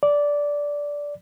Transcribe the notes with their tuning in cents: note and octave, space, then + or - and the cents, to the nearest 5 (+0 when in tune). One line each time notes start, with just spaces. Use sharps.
D5 -10